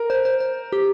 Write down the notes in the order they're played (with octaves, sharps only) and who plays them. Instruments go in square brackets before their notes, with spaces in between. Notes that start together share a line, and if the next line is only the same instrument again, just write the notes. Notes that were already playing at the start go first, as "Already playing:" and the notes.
Already playing: [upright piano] A#4
[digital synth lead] C5
C5
C5
G4